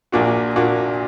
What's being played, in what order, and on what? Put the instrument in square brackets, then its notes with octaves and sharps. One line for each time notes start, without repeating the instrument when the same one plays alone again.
[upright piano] A#1 A#2 A#3 D4 F#4
A#2 A#3 D4 F#4